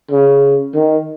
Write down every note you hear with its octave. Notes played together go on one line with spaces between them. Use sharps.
C#3
D#3